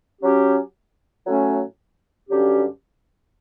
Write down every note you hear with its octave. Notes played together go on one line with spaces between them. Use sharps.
F#3 C#4 G4
A2 F#3 A3 C#4
G2 D3 F#3 C#4 G4